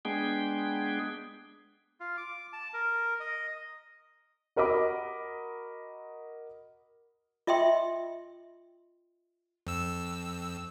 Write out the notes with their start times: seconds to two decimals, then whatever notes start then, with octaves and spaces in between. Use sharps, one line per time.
0.05 G#3 B3 D4 G#4 G5
2.00 F4
2.17 D6
2.53 A5
2.74 A#4
3.20 D#5
4.56 F#4 A#4 D#5 B5 D6
7.47 F4 D#5 E5 G5 C6
9.67 F2 E6